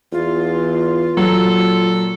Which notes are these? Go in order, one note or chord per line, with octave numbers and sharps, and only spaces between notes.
E2 F4
A#2 F#3 A4